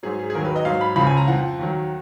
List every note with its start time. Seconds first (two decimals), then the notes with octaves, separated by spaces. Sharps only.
0.03 G#2 F#3 G#4
0.19 G#4
0.30 G#4
0.34 D#2 D#3 F#3 A#4
0.45 B4
0.56 D#5
0.65 G#2 F#3 F5
0.81 B5
0.96 C#2 C#3 F3 B5
1.07 G#5
1.17 A#5
1.28 F2 F3 F#5
1.59 D#2 D#3 F#3